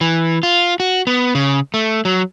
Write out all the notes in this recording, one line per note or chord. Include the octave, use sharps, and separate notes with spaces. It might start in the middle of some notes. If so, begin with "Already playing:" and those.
E3
F4
F#4
B3
C#3
A3
F#3